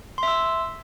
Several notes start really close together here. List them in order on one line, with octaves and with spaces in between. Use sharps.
C6 E5 E6